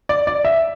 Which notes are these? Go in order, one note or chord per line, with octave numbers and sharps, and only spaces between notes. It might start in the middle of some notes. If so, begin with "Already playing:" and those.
D5
D5
E5